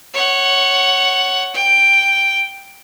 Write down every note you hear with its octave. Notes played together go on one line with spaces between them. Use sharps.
C#5 F#5
G5